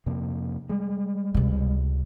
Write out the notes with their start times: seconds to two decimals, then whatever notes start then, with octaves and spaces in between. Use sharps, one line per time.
0.06 F2 C3 A#3
0.69 G3 G#3
1.34 C#2 C3